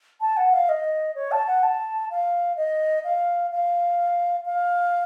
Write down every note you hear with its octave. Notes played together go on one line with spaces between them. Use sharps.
A5
F#5
F5
D#5
C#5
A5
F#5
A5
F5
D#5
F5
F5
F5